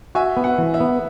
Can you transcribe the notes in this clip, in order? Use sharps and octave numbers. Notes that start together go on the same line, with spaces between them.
F#4 E5 G#5
B3
F#5
E3
E5
B3